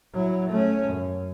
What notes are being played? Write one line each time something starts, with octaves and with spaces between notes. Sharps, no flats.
F#3 E4
A3 C#4
F#2